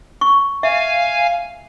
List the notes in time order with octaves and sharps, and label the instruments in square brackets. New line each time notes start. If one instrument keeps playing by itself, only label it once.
[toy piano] C#6
[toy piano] E5 [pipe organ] F5 G#5